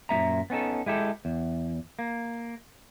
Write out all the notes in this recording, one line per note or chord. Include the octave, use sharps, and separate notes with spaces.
F#2 A#2 B3 E5 A#5
B3 C#4 D#4 A4
G#3 E4 G4 A4
E2
A#3